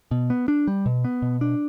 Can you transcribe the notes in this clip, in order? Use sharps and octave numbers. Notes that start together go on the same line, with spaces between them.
B2
B3
D4
G3
B2
B3
B2
D4